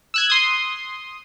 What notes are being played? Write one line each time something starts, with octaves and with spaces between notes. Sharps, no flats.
E6 F#6 G#6
C6 D#6